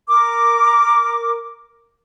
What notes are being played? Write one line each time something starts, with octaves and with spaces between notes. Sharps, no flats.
A#4 D6